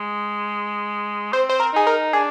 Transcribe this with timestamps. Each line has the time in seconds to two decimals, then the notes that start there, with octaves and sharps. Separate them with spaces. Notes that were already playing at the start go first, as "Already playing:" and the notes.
Already playing: G#3
1.33 C4 C5
1.50 C5
1.60 A#4
1.73 D#4 G#4
1.87 A#4
2.13 D4 G#4